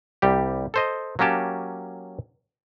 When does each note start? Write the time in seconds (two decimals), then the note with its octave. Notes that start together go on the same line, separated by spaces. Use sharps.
0.22 C2 G3 G4
0.74 A4 C5 D#5
1.19 F#3 A#3 C#4 G4 A5